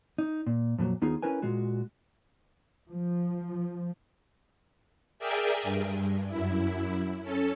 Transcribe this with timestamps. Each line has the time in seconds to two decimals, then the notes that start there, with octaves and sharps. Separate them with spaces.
0.18 D#4
0.46 A#2
0.78 F2 A#2 E3 F#3
1.01 D#2 B3 D#4 F4 G#4
1.22 C#4 E4 A#4 B4 G#5
1.42 A#2 G#3 F4 F#4
2.90 F3
5.19 G#4 A#4 D5 E5 G5 G#5
5.63 G2
6.29 F#2 E4
7.21 C#4 A4